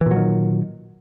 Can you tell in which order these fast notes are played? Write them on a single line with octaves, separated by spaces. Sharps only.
E3 A#2 F#3 D#3